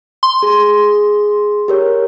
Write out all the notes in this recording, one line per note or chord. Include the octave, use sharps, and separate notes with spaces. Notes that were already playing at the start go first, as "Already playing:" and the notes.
C6
G#4
G4 A#4 C#5